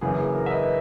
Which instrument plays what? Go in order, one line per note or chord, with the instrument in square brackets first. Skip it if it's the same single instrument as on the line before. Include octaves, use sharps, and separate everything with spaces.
[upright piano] F#2 C#3 E3 A#3 G#4 B4
G#4
A#4
E5
B4 D#5